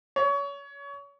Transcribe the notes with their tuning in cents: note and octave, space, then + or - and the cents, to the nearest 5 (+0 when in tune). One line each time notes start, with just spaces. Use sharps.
C#5 +30